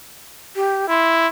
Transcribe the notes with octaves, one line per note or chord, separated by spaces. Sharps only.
G4
E4 C6